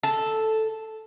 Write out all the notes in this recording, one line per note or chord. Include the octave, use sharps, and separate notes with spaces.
A4